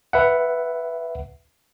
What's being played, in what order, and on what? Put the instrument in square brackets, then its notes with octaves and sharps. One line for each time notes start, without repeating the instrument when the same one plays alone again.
[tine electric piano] B4 E5 F#5